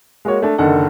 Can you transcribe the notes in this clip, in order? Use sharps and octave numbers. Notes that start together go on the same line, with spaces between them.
G#3 A#3 F#4 C#5
A3 D4
F#1 D3 D#3 D4 A4 F#5